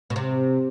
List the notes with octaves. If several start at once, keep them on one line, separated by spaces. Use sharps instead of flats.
B2
C3